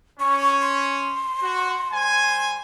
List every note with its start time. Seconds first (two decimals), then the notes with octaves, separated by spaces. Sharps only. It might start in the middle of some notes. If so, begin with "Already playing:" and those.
0.20 C#4 C#6
0.62 C6
1.43 F#4
1.93 G3 C5 G#5